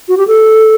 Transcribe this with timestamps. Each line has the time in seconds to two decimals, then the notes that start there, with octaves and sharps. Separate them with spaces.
0.08 F#4
0.17 G4
0.27 A4